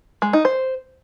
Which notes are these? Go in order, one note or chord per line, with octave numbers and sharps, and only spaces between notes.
G#3
D#4
C5